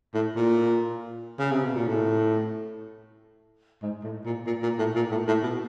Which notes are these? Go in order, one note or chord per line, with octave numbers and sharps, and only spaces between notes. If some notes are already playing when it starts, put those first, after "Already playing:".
A2
A#2
C#3
C3
B2
A#2
A2
G#2
A2
A#2
A#2
A#2
A2
A#2
A2
A2
B2